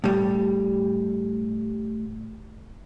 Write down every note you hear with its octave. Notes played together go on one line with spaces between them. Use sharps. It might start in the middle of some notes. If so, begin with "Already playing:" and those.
A2 G3